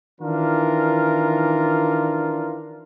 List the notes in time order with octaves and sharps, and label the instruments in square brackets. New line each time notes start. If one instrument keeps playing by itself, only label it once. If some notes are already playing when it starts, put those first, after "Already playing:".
[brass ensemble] D#3 E3 D4 F4 A#4